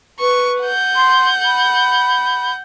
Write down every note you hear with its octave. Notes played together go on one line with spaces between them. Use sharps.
B4 C#6
F#5 G6
C6
B5